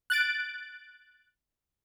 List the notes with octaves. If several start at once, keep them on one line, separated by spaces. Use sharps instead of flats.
F#6 A6 D7